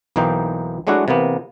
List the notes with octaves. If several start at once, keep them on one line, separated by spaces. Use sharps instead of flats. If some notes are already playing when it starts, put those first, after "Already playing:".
B1 E3 A#3 D#4 C5 G5
F#3 G#3 A3 D4 E4 F#4
C3 E3 A#3 B3